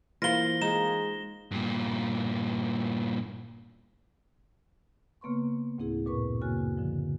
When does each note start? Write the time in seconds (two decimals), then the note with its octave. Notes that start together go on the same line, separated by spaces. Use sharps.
0.22 E3 A#3 F4 C5 F5 A#6 G7
0.62 G#3 D#4 E7
1.51 G2 A#2
5.21 C#3 A#3 B3 B4 C6 C#6
5.78 D2 A2 C4 E4 G#4
6.05 F#2 A#2 B4 C#6
6.42 F#2 C#3 A#3 F#4 G#5 F#6
6.78 D3 F3